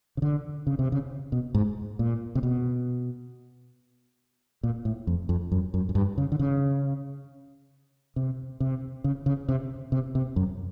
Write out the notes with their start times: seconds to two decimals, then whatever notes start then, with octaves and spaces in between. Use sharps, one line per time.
0.17 C#3
0.22 D3
0.67 C#3
0.79 C3
0.92 C#3
1.32 B2
1.54 G#2
1.99 A#2
2.35 C3
2.43 B2
4.63 A#2
4.85 A2
5.07 F2
5.29 F2
5.52 F#2
5.74 F#2
5.89 F#2
5.95 G2
6.18 C#3
6.32 D3
6.39 C#3
8.16 C3
8.60 C3
9.04 C#3
9.26 C#3
9.49 C3
9.92 C3
10.15 C3
10.36 F#2